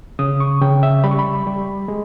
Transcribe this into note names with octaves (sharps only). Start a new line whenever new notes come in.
C#3 D#6
C#6
C#3 G5
E5
G3 B5
C#6
B5
G3
G#3